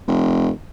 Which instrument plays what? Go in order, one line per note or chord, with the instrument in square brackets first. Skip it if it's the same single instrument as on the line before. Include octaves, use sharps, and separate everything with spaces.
[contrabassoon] F1